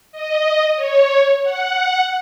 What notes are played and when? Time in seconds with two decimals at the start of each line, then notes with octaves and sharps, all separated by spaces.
0.12 D#5
0.76 C#5
1.43 F#5